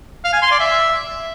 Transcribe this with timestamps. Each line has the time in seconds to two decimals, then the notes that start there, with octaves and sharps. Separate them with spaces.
0.24 F5
0.33 G#5
0.42 C6
0.51 D5
0.60 E5